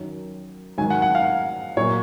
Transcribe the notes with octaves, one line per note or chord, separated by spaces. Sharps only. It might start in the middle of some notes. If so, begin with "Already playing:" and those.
Already playing: F#2 D#3 F#3
G#2 D#3 F#3 G#5
F#5
F#5
F5
A#2 F#3 C#5